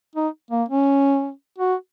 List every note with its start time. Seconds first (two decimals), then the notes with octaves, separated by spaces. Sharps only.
0.16 D#4
0.51 A#3
0.69 C#4
1.58 F#4